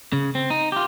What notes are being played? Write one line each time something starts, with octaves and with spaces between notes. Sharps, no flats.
C#3
C4
D#4
F4 G4